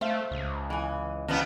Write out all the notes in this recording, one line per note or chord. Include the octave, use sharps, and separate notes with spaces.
A3 C5 E5 F5
C#2
E3 G#5
E2 C#3 B3 D4